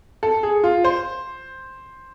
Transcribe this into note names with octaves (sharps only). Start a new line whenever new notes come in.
A4
G#4
F4
C5